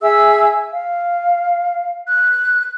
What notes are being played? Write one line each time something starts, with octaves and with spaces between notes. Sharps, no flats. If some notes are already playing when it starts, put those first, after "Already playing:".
G#4 E5 E6
F5
F#6